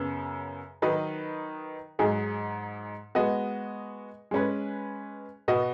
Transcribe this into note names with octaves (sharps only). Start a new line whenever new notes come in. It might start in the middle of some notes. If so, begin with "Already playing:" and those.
Already playing: F#2 C#3 B3
D#3 F#3 D#4 B4 D#5
G#2 F#3 D#4 G#4
G#3 B3 F#4 D#5
G#3 C#4 B4
B2 B3 F#4 D#5